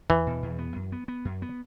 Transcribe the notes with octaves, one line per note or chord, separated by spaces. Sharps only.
E2 E3
B2
E2
B3
F#2
B3
B3
F#2
B3